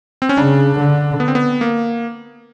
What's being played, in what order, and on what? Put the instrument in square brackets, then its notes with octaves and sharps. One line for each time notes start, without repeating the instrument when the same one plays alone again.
[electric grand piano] C4
C#4
[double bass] C#3 [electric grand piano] D4
[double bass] D3
[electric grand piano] B3
C4
B3
A#3